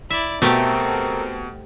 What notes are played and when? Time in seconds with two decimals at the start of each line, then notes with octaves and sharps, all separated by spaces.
0.10 E4 D5 E5
0.42 B2 A3 C4 G4 A4 A#4